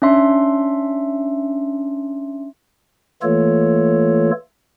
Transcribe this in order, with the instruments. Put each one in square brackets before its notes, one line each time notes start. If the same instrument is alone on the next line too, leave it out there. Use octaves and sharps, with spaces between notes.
[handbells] C#4 D4 E5 C6
[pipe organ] E3 A3 A#3 F4 A4 C#5